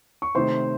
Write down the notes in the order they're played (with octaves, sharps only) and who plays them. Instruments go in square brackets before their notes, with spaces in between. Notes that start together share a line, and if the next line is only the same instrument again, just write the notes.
[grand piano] C#6
[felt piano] C3 D#3 A3 [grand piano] C5 C6